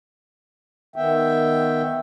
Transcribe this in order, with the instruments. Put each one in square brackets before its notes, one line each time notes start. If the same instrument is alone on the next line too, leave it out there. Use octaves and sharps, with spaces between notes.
[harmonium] D#3 B3 E5 G5